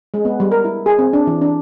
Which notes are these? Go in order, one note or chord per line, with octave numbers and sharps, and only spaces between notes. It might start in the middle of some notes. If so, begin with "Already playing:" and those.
G#3
B3
G3
A#4
E4
G#4
C4
D4
E3
D4